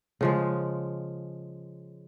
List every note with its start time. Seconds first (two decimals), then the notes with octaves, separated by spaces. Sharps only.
0.21 C#3 F3 G#3